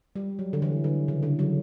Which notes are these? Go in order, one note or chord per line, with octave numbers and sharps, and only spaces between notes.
G3
F#3
D3
E3
D3
C#3
D3
F#3